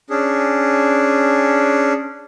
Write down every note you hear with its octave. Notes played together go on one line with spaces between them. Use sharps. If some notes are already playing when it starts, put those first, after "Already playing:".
C#4 D4 G#4